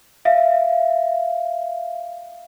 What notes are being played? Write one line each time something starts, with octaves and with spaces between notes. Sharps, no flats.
E5 F5